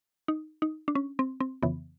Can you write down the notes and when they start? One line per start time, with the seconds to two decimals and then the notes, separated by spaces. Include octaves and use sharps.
0.28 D#4
0.62 D#4
0.88 D4
0.95 C#4
1.19 C4
1.40 C4
1.63 F2 C#3 E3 B3